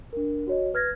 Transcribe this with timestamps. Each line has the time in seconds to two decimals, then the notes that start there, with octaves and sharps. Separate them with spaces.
0.13 D4 A#4
0.47 F#4 C#5 D#5
0.74 B4 F6 G#6 A#6